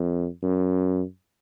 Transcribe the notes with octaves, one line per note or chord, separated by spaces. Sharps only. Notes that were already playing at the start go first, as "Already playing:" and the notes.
Already playing: F2
F#2